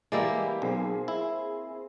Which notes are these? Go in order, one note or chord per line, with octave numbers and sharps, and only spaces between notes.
E3 G3 G#3 A#3 E4 G4 D5
B1 C4 G#4
E4